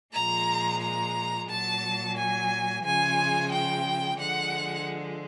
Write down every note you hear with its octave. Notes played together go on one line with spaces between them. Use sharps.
A#2 F3 G#3 A#5
A#5
A#2 F#3 A5
G#5
C#3 F3 G#3 G#5
G5
D3 F3 G#3 F#5